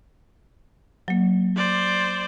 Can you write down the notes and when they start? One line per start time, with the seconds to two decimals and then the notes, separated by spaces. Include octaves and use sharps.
1.08 F#3 A#3
1.56 C5 D5